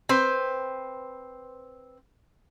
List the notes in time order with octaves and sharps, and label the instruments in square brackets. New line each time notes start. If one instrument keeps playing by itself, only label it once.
[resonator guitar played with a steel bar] C4 B4 C5